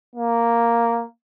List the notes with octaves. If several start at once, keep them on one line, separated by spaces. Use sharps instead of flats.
A#3